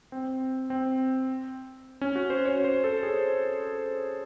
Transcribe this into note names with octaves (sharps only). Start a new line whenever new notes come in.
C4
C4
C#4
F#4
C5
C#5
C5
A4
G#4